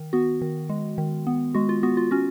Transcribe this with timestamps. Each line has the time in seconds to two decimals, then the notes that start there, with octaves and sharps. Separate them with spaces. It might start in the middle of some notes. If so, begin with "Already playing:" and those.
Already playing: D#3
0.13 B3 F#4
0.41 D#3
0.69 G#3
0.98 D#3
1.27 B3
1.54 G#3 F#4
1.69 F4
1.83 B3 F#4
1.97 F4
2.11 C#4 F#4